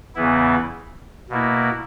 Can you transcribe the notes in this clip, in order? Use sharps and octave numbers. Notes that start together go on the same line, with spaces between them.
E2 C#3 E3 B3 E4
B2 A#3 E4